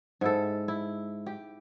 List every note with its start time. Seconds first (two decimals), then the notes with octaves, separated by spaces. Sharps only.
0.21 G#2 E4 A4
0.68 E4
1.27 G4